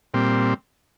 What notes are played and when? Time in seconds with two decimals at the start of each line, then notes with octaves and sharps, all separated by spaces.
0.14 A#2 G3 C4